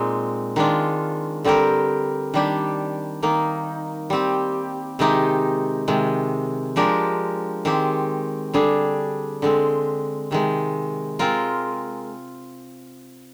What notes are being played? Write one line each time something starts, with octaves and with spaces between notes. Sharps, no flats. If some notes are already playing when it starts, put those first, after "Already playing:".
Already playing: A#2 G#3 C4 D#4
D#3 G#3 D4 F4
D3 G3 C4 G4 A#4
D#3 G3 D4 G4
D#3 A#3 D#4
G3 C4 G4
C3 D#3 G#3 D#4 G4
C3 D#3 G#3
F3 G#3 D4 G4 A#4
D#3 G#3 C4 G4
D3 G3 D4 G#4
D3 G#3 C4
C3 D#3 G#3
G#3 C4 F4 A#4